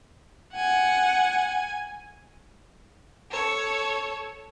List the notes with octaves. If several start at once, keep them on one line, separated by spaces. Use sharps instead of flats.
F#5 G#5
A4 C#5